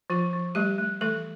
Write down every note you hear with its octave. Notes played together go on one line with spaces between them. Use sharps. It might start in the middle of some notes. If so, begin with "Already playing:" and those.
F3 F4
F3
G3 A3 G4
A3
E3 A3 A4